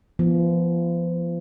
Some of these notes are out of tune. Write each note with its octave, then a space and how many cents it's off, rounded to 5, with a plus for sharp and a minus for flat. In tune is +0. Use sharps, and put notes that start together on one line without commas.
F3 -35 B3 -15